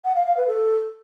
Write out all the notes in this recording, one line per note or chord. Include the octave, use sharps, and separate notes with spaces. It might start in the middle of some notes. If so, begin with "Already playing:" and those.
F#5
F5
F5
B4
A4